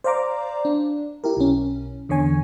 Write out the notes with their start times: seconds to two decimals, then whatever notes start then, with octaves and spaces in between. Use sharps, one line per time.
0.04 C5 D5 F5 A#5 D6
0.65 D4
1.24 E4 G4 A#4
1.37 B1 C#4
2.09 E2 D3 C#5 G#5